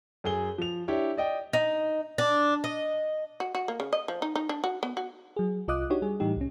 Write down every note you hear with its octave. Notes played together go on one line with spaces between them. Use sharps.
F#2 G#4 G7
F3 F7
D4 E4 G4 C#5
D5 D#5 G5
D#4
D4
D#5
F#4
F#4
A#3
C#3
D#5
F3
D#4
D#4
D4
F#4
B3
F#4
F#3 G#4
C2 F4 D#5 D6 D#6 F#6
D4 D#4 F#4 G4 C#5
G3 G#4
A2 E3 G3 D#4 G4
C2 C#4